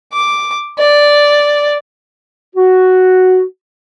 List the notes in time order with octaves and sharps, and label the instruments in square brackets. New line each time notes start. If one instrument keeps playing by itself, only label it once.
[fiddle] D6
D5
[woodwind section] F#4